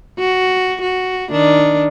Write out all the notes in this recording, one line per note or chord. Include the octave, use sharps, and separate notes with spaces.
F#4
F#4
D#3 D4